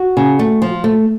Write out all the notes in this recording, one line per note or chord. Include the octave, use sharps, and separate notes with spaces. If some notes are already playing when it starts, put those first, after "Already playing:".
Already playing: F#4
C#3
A3
F3
A3